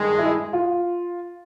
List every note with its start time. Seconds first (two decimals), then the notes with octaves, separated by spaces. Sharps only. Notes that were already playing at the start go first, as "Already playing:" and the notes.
Already playing: G2 D#3 G#3
0.19 E4
0.53 F4